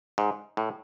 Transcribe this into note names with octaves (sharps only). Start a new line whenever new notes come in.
G#2
A2